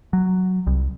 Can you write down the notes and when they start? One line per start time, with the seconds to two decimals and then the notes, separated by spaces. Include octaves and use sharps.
0.13 F#3
0.67 C2